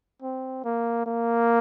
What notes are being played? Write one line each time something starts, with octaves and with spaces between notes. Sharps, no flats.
C4
A#3
A#3